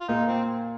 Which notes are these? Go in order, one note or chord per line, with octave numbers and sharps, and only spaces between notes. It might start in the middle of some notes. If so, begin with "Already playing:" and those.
F4
A#2 A#3 D#4
C4